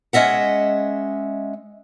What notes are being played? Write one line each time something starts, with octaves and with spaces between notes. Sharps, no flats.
G#3 C#4 D#5 E5 F#5